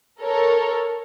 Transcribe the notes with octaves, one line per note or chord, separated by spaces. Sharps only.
A4 A#4 C#5